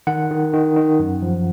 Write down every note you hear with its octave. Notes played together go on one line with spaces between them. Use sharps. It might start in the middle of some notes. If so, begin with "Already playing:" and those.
D#3 F#5
D#3
D#3
D#3
F#2
F3